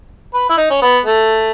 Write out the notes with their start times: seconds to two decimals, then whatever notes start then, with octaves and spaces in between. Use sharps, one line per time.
0.34 B4
0.49 E4
0.57 D#4
0.70 C#4
0.82 B3
1.05 A3